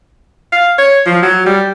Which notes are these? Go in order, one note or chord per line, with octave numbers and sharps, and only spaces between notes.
F5
C#5
F3
F#3
G3